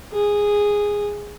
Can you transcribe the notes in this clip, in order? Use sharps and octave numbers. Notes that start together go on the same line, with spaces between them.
G#4